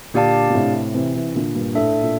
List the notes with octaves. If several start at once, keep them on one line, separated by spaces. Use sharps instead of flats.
A#2 D3 D4 G4 D5 F5 A5
A#2
A2 C3
C3 E3
C3 E3
A#2 D3
G2 A#2
A2 D4 A4 E5
A#2